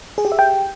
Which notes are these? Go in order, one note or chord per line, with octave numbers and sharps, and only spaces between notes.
G#4
G4
E5
G5